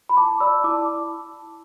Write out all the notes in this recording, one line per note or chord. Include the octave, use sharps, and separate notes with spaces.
B5
E4 A5 D6
D5 B5 E6
E4 A5 D6